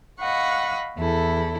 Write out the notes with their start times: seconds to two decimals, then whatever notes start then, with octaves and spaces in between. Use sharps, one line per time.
0.19 D#5 F5 F#5 B5 C#6
0.98 E2 E4 A4